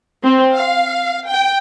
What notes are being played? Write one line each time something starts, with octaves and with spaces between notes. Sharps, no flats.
C4
F5
G5